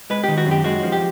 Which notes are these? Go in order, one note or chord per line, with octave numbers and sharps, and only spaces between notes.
G#3 B4
D#3 G4
F#4
F#2 G4
G#3 F#4
F3
G4